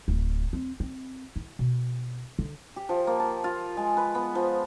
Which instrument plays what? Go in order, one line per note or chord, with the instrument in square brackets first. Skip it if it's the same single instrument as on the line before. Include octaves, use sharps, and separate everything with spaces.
[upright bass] D1
C4
C4
E4
B2
D3
[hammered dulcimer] G4
F3
A#3
A5
F4
G#3
B4
B3
F3